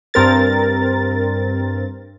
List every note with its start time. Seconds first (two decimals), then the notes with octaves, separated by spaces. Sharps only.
0.14 G2 C4 A#4 A6